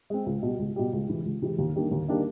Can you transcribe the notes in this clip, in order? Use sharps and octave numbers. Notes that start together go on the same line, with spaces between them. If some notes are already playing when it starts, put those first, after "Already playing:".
G#3 C4
C#2
B2 G3
C#2
B2 G3
C#2
C3 E3 G#3
C#2
C3 E3 G#3
D#2
D#3 G3 A#3 D4
D#2
D#3 G3 A#3 D4